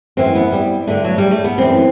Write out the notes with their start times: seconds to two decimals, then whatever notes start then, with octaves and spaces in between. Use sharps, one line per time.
0.17 F#2 E3 C4
0.35 B3
0.52 G3
0.87 G2 D3 A3
1.04 F#3
1.18 G3
1.31 A3
1.44 B3
1.58 F#2 E3 C4